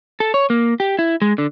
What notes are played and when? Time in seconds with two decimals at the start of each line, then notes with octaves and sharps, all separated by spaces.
0.20 A4
0.34 C#5
0.50 A#3
0.80 G4
0.99 E4
1.22 G#3
1.38 D3